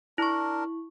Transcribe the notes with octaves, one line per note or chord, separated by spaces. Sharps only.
D4 E4 A#4 C#6